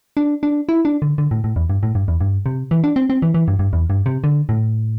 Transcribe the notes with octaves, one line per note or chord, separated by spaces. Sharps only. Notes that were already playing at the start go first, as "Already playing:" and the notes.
D4
D4
E4
D4
D3
D3
A2
A2
E2
G2
A2
G2
E2
G2
C3
E3
D4
C4
C4
E3
E3
G2
G2
E2
G2
C3
D3
A2